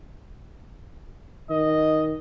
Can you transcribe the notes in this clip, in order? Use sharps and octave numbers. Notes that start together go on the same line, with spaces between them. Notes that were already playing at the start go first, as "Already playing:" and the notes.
D#3 D#5